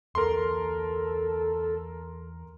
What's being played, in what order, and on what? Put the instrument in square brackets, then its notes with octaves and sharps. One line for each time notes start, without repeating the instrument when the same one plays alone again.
[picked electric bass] E2 A#3 [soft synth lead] A4 [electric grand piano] A#4 C6